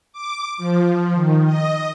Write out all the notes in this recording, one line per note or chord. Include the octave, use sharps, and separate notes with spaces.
D6
F3
D#3
D#5